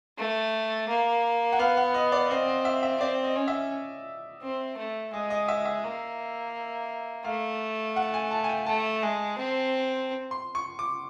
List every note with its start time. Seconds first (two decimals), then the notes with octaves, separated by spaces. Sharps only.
0.18 A3
0.88 A#3
1.52 F#5
1.59 B3 F5
1.77 F#5
1.94 D#5
2.12 D5
2.30 C4 D#5
2.48 D#5
2.65 E5
2.83 E5
3.00 C4 D5
3.24 D#5
3.36 C#4
3.48 E5
4.42 C4
4.77 A3
5.13 G#3 D#5
5.30 D#5
5.48 E5
5.65 E5
5.84 A#3
7.24 A3 F5
7.96 F#5
8.14 G#5
8.31 A5
8.44 G#5
8.49 G5
8.66 A3 A5
9.02 G#3
9.38 C4
10.31 C6
10.55 C#6
10.79 D6